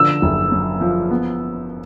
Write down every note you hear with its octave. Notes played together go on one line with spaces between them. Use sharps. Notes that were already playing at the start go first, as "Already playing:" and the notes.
Already playing: D3 F3 E6
F#1
F#2
F3
B3